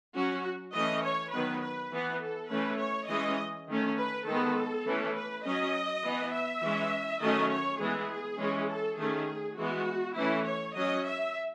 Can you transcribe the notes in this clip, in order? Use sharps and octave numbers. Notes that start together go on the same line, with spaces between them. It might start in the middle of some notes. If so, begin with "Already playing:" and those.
F#3 C#4 F#4
E3 A3 C#4 D#5
C#5
D#3 F#3 B3 B4
B4
E3 B3
A4
E3 A3 C#4 B4
C#5
E3 G#3 C#4 D#5
D#3 A3 C#4
B4
D#3 G#3 B3 A4
E3 A3 C#4
B4
F#3 C#4 D#5
E3 B3
E5
E3 G#3 C#4
D#3 F#3 A3 C#4 D#5
C#5
E3 G#3 B3 G#4
E3 G#3 C#4
A4
D#3 A3 C#4 G#4
E3 G#3 B3 F#4
E3 A3 C#4 E4
C#5
F#3 C#4 D#5
E5